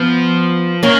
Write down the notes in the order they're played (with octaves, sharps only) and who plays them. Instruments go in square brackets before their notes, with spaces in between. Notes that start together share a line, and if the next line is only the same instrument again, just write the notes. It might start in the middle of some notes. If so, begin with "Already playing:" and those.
Already playing: [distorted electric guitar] F3 [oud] B3
[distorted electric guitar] D#3 [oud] A#3 C#4